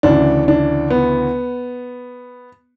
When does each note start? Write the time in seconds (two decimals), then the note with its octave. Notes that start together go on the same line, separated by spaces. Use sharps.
0.03 D2 C#3 E3 D4
0.48 D4
0.90 B3